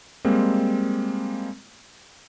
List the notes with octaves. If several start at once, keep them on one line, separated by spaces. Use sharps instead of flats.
G3 G#3 A#3 C4